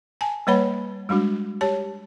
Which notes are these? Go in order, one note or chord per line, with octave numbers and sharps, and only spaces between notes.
G#5 A5
G3 A#3 B4 C#5 F#5 B5
G3 G#3 D4 F#4
G4 C#5 A5